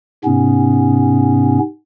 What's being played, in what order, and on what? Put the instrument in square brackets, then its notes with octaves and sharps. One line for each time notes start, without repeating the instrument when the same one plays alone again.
[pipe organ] G#2 C3 B3 C#4